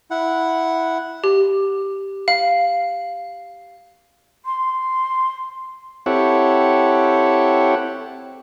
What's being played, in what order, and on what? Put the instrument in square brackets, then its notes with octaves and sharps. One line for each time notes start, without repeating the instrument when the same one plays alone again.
[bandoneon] E4 F#5
[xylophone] G4
F5
[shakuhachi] C6
[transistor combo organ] C4 E4 G4 A4 C#5 F#5